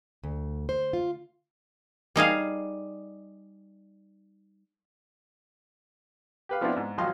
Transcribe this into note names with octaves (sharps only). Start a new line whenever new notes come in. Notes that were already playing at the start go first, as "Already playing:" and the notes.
D2
C5
F4
G3 D#4 G#4 F5
G4 B4 F5
F3 B3 C4 D4 E4 F4
G#2
G#1 F3 F#3 D#5 F5 C6